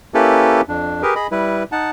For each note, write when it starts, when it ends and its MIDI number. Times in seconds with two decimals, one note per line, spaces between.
0.14 0.61 58
0.14 0.61 61
0.14 0.61 64
0.14 0.61 67
0.14 0.61 69
0.14 0.61 71
0.68 1.02 41
0.68 1.02 62
1.02 1.14 67
1.02 1.14 68
1.02 1.14 70
1.02 1.14 71
1.16 1.27 68
1.16 1.27 75
1.16 1.27 83
1.32 1.63 55
1.32 1.63 64
1.32 1.63 71
1.72 1.91 63
1.72 1.91 78
1.72 1.91 81